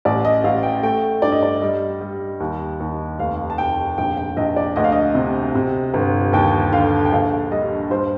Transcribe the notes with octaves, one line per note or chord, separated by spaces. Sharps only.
A1 D5
D#5
A1 F5
G5
A3 G5
G2 D5
D#5
D5
G3 D#5
G3
D#2
D#2
F1 F5
A5
F1 G5
A#1 G5
G5
A#1 D#5
D5
D2 D#5
F5
D#5
C3
C3
G1
D#2 G5
D3 F5
G5
A#1 F5
G3 D#5
G2 C5